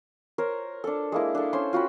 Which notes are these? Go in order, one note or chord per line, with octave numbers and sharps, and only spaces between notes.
A#4 C5 C#5
D4 A4
G#3 A#3 E4
D4 A4
C#4 C5 C6
F4 F#4 G5 B5